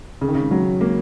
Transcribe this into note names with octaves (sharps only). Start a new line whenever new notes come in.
C#3
D#3
C#3
F#3
A#3